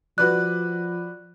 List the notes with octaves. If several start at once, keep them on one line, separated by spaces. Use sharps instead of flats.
F3 F#4 B4 D5 F#6